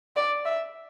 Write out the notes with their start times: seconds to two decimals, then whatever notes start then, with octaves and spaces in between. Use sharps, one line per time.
0.16 D5
0.45 E5